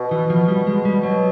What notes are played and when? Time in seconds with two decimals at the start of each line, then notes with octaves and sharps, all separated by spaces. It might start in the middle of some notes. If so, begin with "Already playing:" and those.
Already playing: B2
0.11 E3
0.30 F3
0.48 G3
0.67 G#3
0.85 G3
1.03 B2 F#3